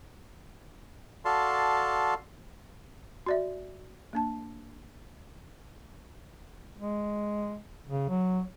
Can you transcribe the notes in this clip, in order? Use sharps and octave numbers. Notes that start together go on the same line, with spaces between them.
F#4 A4 D5 F5 A5 C6
F#4 D5 E5
A#3 D4 A5
G#3
C#3
F#3